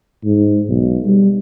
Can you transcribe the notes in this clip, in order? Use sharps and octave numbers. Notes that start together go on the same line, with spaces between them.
G#2
B1
G3